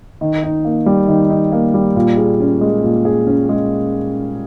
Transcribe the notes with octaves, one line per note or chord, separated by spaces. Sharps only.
D#3
D#4
A#3
G3
D#3
D#4
A#3
G3
A#2
G#4
C#4
G#3
A#2
G#4
C#4
G#3